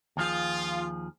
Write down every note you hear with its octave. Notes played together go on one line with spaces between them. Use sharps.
D#2 F3 F4 G#4